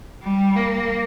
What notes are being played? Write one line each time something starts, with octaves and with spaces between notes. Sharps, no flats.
G3
A#3